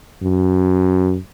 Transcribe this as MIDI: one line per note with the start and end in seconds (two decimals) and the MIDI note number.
0.23 1.17 42